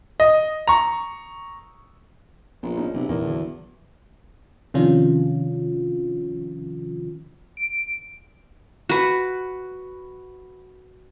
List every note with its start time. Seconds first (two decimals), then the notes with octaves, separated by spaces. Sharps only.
0.20 D#5
0.67 A#5 C#6
2.63 A#1 B3
2.77 B3 C#4 D#4
2.94 B1 C3
3.09 A#1 E2 A#4
3.25 D3 F#3
4.74 C3 D#3 F3 C#4 D4 F4
7.57 D7
8.89 F#4 B4